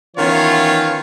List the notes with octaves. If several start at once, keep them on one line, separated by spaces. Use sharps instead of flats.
D#3 E3 B3 C#4 F4 C#5